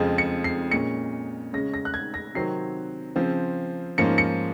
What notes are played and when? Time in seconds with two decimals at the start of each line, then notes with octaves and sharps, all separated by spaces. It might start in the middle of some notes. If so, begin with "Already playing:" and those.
Already playing: F2 C#3 F3 G#3
0.18 C#7
0.44 C7
0.71 A#2 G#3 C#4 C#7
1.53 C#3 G#3 C#4 A#6
1.74 A#6
1.85 F#6
1.94 G#6
2.14 A#6
2.35 C3 D#3 F#3 C4 C7
3.16 C#3 F3 C4
3.98 G#2 F3 A#3 C#4 C#7
4.18 C#7